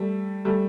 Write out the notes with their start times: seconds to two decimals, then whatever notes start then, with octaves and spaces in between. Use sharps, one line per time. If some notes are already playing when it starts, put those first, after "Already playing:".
Already playing: G3 A3
0.45 G3 A3